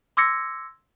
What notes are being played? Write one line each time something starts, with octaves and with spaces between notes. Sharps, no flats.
C6 D6 E6 G#6 A#6 C#7